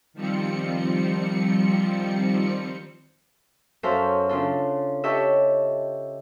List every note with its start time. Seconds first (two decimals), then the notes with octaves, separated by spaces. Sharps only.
0.14 D#3 F3 G3 C4 C#7
3.83 F#2 A4 C5 E5 F5
4.29 C#3 D4 F4 A4
5.04 G4 A4 C#5 D#5 E5